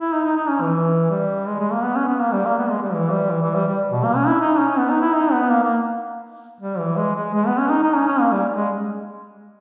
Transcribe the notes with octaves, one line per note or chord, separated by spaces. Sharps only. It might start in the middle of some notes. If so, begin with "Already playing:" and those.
E4
D#4
D#4
D#4
C#4
E3
G3
G#3
G#3
A#3
B3
C#4
B3
A#3
G3
A#3
B3
G#3
G3
E3
G3
E3
E3
G3
G3
B2
A#3
C#4
E4
D#4
C#4
B3
D#4
E4
D#4
B3
A#3
A#3
G3
E3
G#3
G#3
G#3
B3
C#4
D#4
D#4
C#4
C#4
A#3
G3
G#3